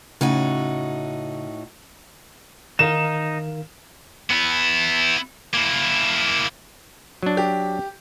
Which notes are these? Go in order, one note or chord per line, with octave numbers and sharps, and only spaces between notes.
A2 C#3 D#4 F#4
D#3 D#4 A#4 F5 E7
B3 E4
A#3 E4
F#3 D4
G4